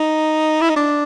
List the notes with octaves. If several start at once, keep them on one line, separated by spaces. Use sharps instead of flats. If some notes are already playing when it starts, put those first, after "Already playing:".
Already playing: D#4
E4
D#4
D4